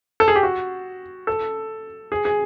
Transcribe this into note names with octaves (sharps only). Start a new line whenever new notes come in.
A4
G#4
G4
F#4
A4
G#4
G#4